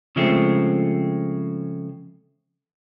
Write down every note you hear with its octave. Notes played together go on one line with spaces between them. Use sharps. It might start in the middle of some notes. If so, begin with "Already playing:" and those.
C#3 F3 G#3 A3 C4